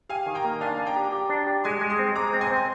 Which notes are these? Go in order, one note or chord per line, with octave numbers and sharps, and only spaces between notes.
G4 F5 G#5
D#3
G5 A#5
A#3
D4 F5 G#5
D4
G5 A#5
G4
G4
D4
G4
G#3 G#5 C6
G#3
C6 D#6
C4
G#3 A#5 D6
C4
G#5 C6
C4
C6